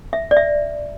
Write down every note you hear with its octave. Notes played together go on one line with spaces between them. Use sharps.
E5
D5
E5